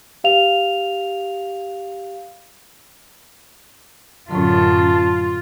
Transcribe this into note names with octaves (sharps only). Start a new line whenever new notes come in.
G4 F5 F7
F#2 A2 D3 F4 A5